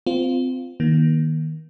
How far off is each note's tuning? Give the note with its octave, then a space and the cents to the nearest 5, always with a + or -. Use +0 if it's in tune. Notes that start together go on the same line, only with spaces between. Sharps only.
C4 -25 F4 +0
D#3 +0 A#3 +35